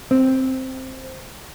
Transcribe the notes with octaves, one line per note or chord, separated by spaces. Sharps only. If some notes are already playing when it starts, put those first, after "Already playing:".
C4